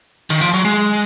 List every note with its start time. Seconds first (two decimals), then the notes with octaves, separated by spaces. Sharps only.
0.30 D#3
0.41 F3
0.54 F#3
0.65 G#3